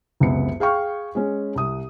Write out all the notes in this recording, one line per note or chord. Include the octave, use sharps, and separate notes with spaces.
F#1 C#2 C3 B3 E5 C#7
G#4 F5 G5 C#6 F6
G#3 C#4
C2 D#6